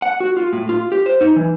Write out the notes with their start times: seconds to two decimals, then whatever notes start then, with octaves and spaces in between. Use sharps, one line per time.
0.02 F#5
0.20 F#4
0.37 F4
0.53 A2
0.69 F4
0.92 G4
1.06 C5
1.21 D#4
1.36 E3